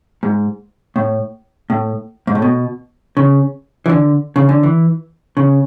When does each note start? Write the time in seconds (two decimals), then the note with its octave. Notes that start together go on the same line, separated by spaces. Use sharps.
0.23 G#2
0.96 A2
1.70 A2
2.27 G#2
2.35 A2
2.42 B2
3.17 C#3
3.86 E3
3.89 D3
4.36 C#3
4.49 D3
4.63 E3
5.37 C#3